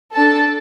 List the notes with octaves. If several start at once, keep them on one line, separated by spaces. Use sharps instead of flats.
D4 A4 A5